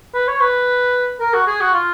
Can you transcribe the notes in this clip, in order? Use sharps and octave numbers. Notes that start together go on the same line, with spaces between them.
B4
C#5
B4
A#4
F#4
G#4
F#4
F4